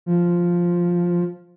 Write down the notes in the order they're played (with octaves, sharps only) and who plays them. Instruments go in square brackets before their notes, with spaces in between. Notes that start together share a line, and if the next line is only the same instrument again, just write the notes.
[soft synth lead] F3